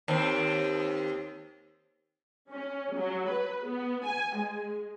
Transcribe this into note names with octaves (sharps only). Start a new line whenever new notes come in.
D#2 C4
C#4
F#3
B4
B3
G#5
G#3